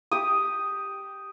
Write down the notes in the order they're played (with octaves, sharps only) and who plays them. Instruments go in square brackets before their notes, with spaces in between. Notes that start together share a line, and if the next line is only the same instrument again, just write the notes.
[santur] G4 D#6